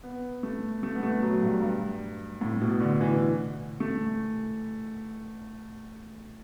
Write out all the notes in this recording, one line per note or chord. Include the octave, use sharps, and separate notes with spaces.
B3
A3
A3
B3
A3
F#3
G2
G2
A2
B2
D3
E3
A3